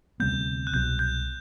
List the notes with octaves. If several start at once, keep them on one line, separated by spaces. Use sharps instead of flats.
D2 C3 G3 B3 G6
F#6
C2 B2 F#3 G6
G6